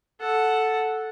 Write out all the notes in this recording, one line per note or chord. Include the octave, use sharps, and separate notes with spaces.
A4 F#5